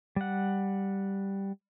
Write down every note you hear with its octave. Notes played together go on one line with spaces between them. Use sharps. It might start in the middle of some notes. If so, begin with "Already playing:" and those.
G3 F#5